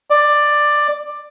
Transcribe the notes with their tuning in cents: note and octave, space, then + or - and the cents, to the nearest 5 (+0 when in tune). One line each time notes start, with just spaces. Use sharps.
D5 +10